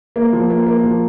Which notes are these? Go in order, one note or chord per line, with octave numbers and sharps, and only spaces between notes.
A#3
F3
A#3
A#3
F3